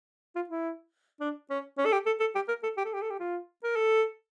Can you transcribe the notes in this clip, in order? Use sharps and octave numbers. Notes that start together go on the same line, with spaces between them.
F4
E4
D4
C#4
C#4
A4
G4
A4
A4
G4
A#4
A4
G4
A4
G4
A4
G4
F4
A#4
A4